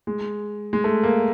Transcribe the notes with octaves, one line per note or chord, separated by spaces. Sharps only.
G#3
G#3
A3
A#3